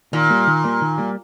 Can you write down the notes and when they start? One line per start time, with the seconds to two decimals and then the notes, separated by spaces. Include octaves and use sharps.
0.13 A#2 D#3
0.30 G3 A#3
0.47 D#3
0.64 G3 A#3
0.81 D#3
0.98 G3 A#3